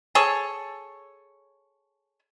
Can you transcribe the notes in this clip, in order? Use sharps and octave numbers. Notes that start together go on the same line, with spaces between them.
G#4 A4 C#5